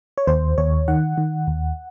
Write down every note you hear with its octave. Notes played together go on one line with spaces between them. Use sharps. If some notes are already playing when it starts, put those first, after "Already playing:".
C#5
D#2 C5
D#2 C#5
D#3 F#5
D#3
D#2